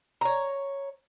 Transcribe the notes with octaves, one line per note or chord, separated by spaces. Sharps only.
C#5 A#5